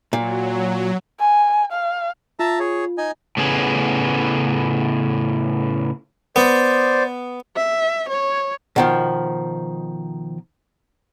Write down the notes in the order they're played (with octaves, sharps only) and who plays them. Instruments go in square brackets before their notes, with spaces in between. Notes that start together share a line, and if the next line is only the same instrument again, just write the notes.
[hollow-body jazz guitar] A#2 [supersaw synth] F#3
[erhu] G#5
F5
[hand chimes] F4 [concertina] E5 A5 A#5
[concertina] G#4 C#5
D#4 D#5 G#5
[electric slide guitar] A2 C#3 B3 G#4
[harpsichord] B3 [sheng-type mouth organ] C5 D5
[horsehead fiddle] E5
C#5
[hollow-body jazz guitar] B2 D#3 F3